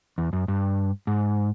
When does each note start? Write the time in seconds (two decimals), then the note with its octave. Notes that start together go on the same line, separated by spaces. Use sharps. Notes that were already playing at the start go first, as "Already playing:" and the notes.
0.18 E2
0.33 F#2
0.48 G2
1.07 G#2